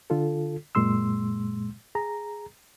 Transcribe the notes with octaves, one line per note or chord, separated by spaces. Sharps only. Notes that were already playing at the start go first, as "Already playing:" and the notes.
D3 F4 A4
F#2 A#2 G#3 C6 E6
G#4 A#5